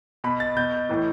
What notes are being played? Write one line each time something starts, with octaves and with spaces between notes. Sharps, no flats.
B2 B5
A6
B2 G6
A2 E3